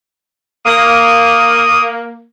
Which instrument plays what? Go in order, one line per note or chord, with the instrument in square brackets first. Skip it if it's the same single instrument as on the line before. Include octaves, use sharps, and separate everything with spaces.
[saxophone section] A#3 [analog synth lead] D#6